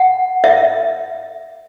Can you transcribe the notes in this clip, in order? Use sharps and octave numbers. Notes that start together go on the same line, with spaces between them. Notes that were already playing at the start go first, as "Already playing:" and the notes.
Already playing: F#5
E5